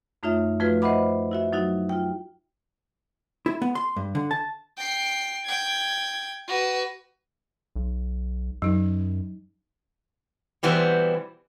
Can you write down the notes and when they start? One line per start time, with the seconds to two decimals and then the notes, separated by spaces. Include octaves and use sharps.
0.23 F#2 A3 D#4 F4 C#5 E5
0.60 F3 A3 F4 F#4 B4
0.82 C5 D#5 E5 F#5 B5 D6
1.31 E4 F#4 E5
1.53 F#3 D#4 E4 F#4
1.89 F4 G5
3.46 E4
3.62 B3
3.75 C6
3.96 G2
4.15 D3
4.31 A5
4.78 G5 C7
5.45 G5 G#6
6.48 F#4 B4
7.76 B1
8.62 F#2 F#3 D#4
10.63 B2 E3 G3 B3 C4